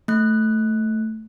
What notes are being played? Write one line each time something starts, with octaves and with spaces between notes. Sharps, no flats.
A3 F#6